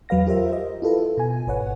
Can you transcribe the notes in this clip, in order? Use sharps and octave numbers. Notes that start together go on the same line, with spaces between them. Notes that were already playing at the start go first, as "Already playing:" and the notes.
E2 F#3 B4 F5 A#6
F4 G4 A#4 C5 E5
D#5
E4 F4 A4 B4
B2 G#5
G#1 B4 C#5 F#5